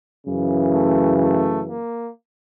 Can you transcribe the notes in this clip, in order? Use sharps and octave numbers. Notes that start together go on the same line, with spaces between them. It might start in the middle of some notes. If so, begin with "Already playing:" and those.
F#2 C#3 E3
A3
A3
A#3